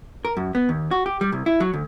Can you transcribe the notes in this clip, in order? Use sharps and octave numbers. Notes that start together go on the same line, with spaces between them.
A#4
F#2
B3
D#2
F#4
G4
G3
C2
E4
F#3
D2